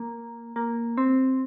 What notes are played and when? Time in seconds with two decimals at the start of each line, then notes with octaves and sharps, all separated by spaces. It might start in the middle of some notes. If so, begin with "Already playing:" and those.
Already playing: A#3
0.56 A#3
0.97 C4